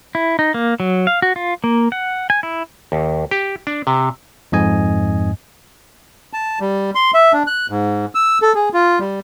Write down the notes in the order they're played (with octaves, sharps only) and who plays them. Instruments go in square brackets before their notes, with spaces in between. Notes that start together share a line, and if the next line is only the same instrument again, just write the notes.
[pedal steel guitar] E4
D#4
A#3
F#3
F5
F#4
F4
A#3
F#5
G#5
E4
[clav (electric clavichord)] D#2
G4
D4
C3
[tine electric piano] F2 G#2 D#5 G#5
[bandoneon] A5
G3
C6
E5
D4
F#6
G#2
E6
A4
G#4
F4
G3